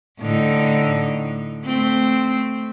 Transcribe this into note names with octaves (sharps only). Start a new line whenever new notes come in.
A2 D3 D#4
A3 C4